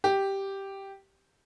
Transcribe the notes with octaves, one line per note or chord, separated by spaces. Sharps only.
G4